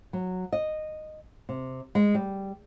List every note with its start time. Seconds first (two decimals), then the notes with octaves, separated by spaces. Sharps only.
0.13 F#3
0.52 D#5
1.49 C3
1.95 G#3
2.15 G3